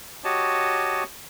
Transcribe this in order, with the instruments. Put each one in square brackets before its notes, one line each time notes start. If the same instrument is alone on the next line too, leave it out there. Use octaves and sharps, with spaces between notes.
[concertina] F#4 G4 C#5 D#5 A5